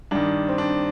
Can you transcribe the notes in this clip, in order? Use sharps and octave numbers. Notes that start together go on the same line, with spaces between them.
G2 D#3 D4
C4
D4